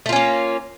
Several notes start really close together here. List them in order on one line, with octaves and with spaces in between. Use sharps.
A3 F4 C#4 A#3